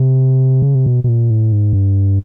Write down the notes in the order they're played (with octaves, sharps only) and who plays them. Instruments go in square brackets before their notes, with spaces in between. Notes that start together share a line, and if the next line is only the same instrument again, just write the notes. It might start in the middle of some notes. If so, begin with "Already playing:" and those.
Already playing: [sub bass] C3
C#3
C3
B2
B2
A#2
A2
G#2
G2